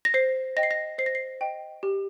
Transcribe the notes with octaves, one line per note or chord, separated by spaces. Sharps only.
A#6
C5 C7
D#5 G5 A#6
C7
A#6
C5 C7
A#6
C7
D#5 G5
G4